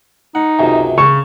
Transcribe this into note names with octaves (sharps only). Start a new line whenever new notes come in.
D#4 F#5
C#2 F#2 C3
C#3 C#5 A5 C#6